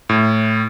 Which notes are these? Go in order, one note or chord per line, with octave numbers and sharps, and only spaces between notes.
A2